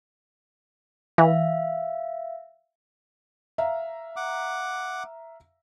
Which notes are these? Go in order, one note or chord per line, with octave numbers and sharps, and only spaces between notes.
E3 E5 F5
E5 F5 A#5
F#5 D6